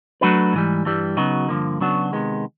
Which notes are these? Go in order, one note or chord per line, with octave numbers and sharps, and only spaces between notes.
F#3 A3 D4 F#4 B4
G#2 E3 G3
G2 E3 G3
C#3 F#3 B3 D#4 F#4
G2 D3 F3 A#3
C#3 F#3 B3 D4 F#4
C3 D#3 G#3 B3